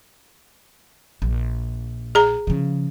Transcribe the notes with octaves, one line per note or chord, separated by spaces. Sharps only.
A#1
G#4 A#5
C#3 F3